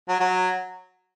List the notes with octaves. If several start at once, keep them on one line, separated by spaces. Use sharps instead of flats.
F#3
F#3